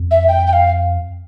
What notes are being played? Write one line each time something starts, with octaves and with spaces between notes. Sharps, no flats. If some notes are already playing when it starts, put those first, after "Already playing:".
Already playing: F2
E5
G5
G5
F5